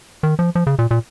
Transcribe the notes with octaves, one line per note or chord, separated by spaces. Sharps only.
D#3
F3
F3
C#3
A#2
A#2